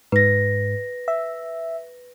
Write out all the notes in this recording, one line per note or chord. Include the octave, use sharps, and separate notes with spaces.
G#2 B4 A#6
E5